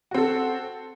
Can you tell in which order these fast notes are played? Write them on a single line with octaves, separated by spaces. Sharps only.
F#4 C4 A4